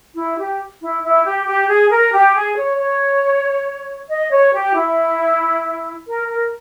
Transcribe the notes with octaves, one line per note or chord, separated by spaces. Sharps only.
E4
G4
E4
E4
G4
G4
G#4
A#4
G4
G#4
C#5
C#5
D#5
C#5
G4
E4
A#4
A#4